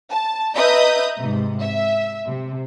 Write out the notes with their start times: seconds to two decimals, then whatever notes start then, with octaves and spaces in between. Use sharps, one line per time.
0.11 A5
0.55 B4 D#5 E5 A#5 D#6 G6
1.21 G#2 C3
1.61 E5
2.27 C3